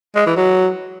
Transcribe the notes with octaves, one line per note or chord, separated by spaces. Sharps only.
G#3
E3
F#3